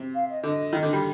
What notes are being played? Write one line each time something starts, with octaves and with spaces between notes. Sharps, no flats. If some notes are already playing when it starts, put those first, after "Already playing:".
Already playing: C3
F5
D#5
D3 D#5
D#3
D3
G3